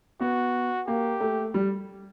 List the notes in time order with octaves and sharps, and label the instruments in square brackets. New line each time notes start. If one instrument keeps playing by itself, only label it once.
[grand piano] B3 [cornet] F#4
[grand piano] A#3 [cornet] G4
[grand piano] A3
G3